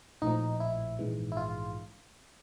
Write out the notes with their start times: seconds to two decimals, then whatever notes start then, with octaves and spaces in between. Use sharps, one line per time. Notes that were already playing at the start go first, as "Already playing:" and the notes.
0.22 A#1 A2 F3 D#4
0.60 E4
0.99 A#1 G#2 E3 G#3
1.32 E4
1.37 F4